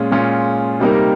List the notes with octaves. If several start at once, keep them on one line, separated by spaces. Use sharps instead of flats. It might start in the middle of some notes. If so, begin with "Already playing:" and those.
Already playing: A#2 G#3 C#4 F4
A#2 G#3 C#4 F4
C3 G3 A#3 D#4 A#4